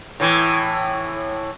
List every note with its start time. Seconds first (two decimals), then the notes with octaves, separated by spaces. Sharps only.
0.20 A2 E3